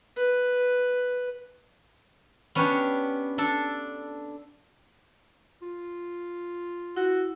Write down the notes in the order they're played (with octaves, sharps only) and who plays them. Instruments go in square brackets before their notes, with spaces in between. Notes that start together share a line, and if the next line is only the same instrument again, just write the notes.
[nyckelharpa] B4
[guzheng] B3 C#4 D4 G4 B4 C#5
D4 A4 A5
[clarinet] F4
[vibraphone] E4 [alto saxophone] F#4